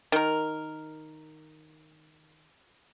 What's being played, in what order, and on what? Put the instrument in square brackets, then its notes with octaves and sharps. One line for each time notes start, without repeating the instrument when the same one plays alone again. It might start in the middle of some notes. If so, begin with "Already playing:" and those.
[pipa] D#3 A#4